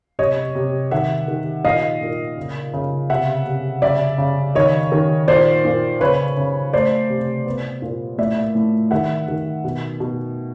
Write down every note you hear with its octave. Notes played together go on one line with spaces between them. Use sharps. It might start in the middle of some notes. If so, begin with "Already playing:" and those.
C3 C#5 D#5
C3
D#3 E5 F#5
D#3
A#2 D#5 F5
A#2
C#3
C#3
C3 E5 F#5
C3
C#3 D5 E5
C#3
D#3 C#5 D#5
D#3
A#2 C5 D5
A#2
C#3 B4 C#5
C#3
A3 C5 D5
C3
B3
A#2
A2 D5 E5
A2
D#3 E5 F#5
D#3
B2
B2